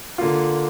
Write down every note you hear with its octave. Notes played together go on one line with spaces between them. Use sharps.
D3 A#3 F4